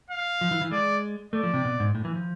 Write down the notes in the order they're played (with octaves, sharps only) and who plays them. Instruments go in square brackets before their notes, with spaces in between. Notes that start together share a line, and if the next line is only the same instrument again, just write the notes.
[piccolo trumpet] F5
[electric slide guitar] F3
E3
E3
[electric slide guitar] G#3 [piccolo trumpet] D5
[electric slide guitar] A3 [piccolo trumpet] D5
[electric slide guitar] F3
C3
B2
G#2
A2
E3
F3